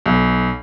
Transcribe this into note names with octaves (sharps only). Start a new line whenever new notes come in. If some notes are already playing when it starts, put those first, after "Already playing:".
B1